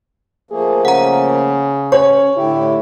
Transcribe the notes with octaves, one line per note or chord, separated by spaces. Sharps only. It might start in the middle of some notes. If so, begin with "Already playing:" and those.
F3 A3 A#3 G#4
C#3 F#5 A#5
C#4 C#5 C#6
A2 D3 E4 G4